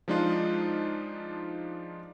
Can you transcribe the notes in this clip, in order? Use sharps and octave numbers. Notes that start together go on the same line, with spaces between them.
F3 G#3 D4 D#4 F4